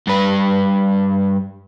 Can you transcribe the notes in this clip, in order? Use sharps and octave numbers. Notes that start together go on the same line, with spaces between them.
G2 B4